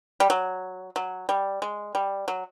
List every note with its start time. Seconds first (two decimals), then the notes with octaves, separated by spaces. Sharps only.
0.20 G3
0.30 F#3
0.96 F#3
1.29 G3
1.62 G#3
1.95 G3
2.28 F#3